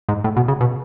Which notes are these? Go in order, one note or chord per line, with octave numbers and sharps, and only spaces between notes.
G#2
A2
B2
C#3
B2